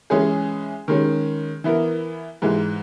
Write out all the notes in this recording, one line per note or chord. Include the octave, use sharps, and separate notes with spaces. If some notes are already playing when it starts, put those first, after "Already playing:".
E3 G#3 C#4 G#4
D#3 G#3 C#4
E3 B3 E4 A#4
G#2 E3 G#3